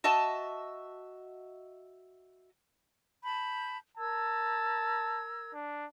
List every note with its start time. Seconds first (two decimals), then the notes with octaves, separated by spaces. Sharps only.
0.04 F#4 D#5 E5 A5
3.24 A5 B5 G6
3.98 A#4 A5 E6 G#6
5.54 D4